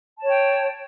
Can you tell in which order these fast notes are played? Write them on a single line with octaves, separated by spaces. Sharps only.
A5 C#5 G5